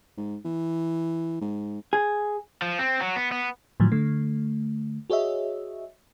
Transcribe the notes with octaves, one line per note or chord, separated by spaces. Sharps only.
G#2
E3
G#2
G#4
F3
C4
F#3
B3
B3
A2 D3 D#3 F3 F#3
D3 A3
F#4 G#4 C#5 D#5 E5